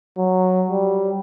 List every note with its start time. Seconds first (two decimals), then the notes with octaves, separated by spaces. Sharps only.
0.18 F#3
0.71 G3